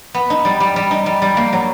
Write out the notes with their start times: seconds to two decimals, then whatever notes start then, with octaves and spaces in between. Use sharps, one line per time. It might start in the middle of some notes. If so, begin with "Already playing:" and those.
0.14 B3
0.30 D#4
0.45 G3
0.60 G3
0.76 G3
0.91 D#4
1.06 G3
1.22 G3
1.37 A#3
1.53 F#3